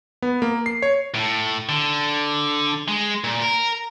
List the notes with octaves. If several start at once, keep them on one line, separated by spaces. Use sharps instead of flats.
B3
A#3
C7
C#5
A2
D3
G#3
A#2
A#4